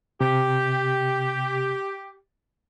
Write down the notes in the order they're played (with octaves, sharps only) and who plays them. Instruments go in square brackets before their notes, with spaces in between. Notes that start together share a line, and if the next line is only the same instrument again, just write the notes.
[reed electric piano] C3 [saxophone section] G4